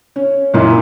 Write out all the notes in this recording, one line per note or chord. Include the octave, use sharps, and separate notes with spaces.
C#4
F#2 A#2 A#3 D#4 E4